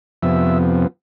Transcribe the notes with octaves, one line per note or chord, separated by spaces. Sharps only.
F2 C3 F3 B3 E5